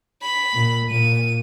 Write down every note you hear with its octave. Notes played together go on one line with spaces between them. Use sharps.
B5
A#2
A#2 D#7